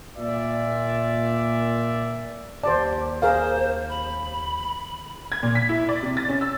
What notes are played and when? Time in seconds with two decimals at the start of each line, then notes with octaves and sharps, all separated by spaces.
0.16 A#2 D5 E5
2.63 D#2 G4 C5 D5 A5
3.22 G#4 A#4 C5 F5
3.89 B5
5.32 G#6
5.43 A#2
5.55 B6
5.69 E4
5.89 D5
6.03 C3
6.17 A6
6.29 C#4
6.41 E6